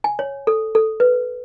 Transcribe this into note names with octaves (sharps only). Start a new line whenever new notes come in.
G#5
C#5
A4
A4
B4